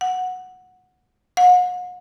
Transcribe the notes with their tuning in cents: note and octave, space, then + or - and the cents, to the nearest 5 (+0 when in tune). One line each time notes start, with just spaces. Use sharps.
F#5 -10
F#5 -40